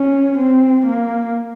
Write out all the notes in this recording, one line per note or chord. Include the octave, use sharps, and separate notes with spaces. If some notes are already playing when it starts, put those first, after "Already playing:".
Already playing: C#4
C4
A#3